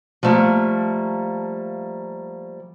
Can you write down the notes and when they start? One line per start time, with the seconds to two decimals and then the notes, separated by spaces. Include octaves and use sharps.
0.23 F3 G3 A3 A#3